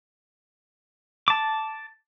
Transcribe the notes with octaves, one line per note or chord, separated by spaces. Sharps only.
A5 D6